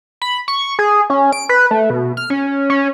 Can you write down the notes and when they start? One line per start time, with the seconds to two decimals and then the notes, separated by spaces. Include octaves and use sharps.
0.22 B5
0.48 C#6
0.79 G#4
1.10 C#4
1.33 D7
1.49 B4
1.71 A3
1.90 B2
2.17 F6
2.30 C#4
2.70 C#4